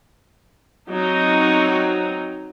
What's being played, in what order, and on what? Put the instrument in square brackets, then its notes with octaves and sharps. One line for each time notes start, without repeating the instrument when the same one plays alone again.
[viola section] F#3 C4 D#4